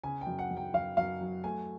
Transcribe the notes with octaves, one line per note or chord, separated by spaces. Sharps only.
C#3 G#5
G5
F#2
F#5
F#2
G5
F#2 F5
F#2 F5
F#3
A3 G#5